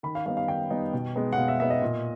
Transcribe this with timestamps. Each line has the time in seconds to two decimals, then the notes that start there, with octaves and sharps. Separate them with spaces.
0.03 D#3 B5
0.15 F5
0.26 G3 B3 D#4 F5
0.37 F5
0.48 D#3 G5
0.70 G3 B3 D#4
0.93 B2
1.15 G#3 B3 D#4
1.33 F#5
1.38 B2 F5
1.48 E5
1.60 G#3 B3 D#4 E5
1.70 D#5
1.82 A#2